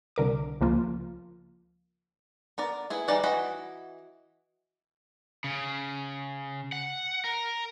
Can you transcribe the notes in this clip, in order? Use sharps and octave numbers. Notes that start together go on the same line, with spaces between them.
C2 D3 A#4 D6
C#2 F3 A#3 F4
B3 A#4 D5
B3 E4 G#4
E3 G3 D#4 D5 F#5
E3 F#4 D#5 F#5 B5
C#3
F#5
A#4